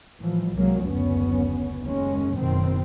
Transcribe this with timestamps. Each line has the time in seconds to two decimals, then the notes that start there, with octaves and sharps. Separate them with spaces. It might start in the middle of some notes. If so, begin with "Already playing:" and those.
0.19 A2 E3 F3 G3
0.54 C2 F#3 G#3 A#3
0.85 F#1 D2 B3 C#4
1.81 F#1 D#2 G#3 C#4
2.35 F#1 B2 D#3 C4